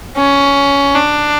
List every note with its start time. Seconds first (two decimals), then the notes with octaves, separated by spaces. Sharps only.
0.17 C#4
0.95 D4